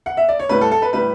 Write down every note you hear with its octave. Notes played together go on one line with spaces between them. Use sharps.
F#5
E5
D5
C#5
A2 G3 B4
A4
A4
B4
A2 G3 B4